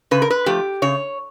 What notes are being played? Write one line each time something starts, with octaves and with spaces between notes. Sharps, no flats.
C#3 B4
A#4
B4
F3 A3 G4
C#3 C#5